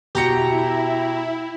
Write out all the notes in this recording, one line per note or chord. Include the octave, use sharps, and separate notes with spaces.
B2 E4 G4 A#5 C#7